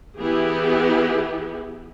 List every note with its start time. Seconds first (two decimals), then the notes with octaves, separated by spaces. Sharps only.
0.19 E3 B3 E4 G4 G#4